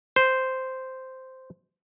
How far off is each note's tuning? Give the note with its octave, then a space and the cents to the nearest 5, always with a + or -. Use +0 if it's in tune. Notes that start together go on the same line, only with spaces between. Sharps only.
C5 -5